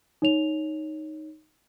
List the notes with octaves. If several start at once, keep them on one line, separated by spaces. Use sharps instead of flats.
D#4 C#5 F7